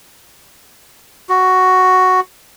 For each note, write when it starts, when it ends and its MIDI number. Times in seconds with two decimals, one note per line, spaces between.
1.29 2.20 66